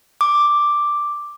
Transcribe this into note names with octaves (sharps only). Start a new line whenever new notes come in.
D6